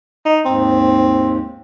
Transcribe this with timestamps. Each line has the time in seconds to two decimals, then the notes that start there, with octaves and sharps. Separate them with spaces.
0.25 D#4
0.45 D#2 G#2 C4